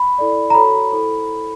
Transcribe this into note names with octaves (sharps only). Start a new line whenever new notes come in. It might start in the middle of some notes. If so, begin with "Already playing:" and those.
Already playing: B5
E4 A4 D5
A#5
F#4 A4 C#5 B5
E4 A4 C5